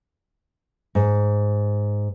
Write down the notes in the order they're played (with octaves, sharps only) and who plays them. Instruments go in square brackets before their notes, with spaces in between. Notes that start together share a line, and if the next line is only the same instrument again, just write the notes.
[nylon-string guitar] G#2